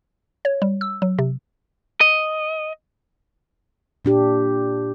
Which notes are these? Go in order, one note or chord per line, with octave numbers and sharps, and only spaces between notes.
C#5
G3
E6
F#3
C3
D#5
A#2 D4 G4